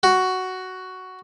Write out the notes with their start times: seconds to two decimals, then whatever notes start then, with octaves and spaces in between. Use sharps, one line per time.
0.03 F#4